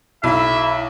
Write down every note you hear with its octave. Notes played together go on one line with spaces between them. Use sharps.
B1 E4 E5